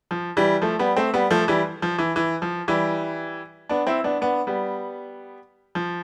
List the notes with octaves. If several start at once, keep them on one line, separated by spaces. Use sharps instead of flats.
F3
E3 G3
F3 A3
G3 B3
A3 C4
G3 B3
F3 A3
E3 G3
F3
E3
E3
F3
E3 G3
B3 D4
C4 E4
B3 D4
B3 D4
G3 B3
F3